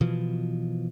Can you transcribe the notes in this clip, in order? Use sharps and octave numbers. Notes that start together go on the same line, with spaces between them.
B2 E3 F3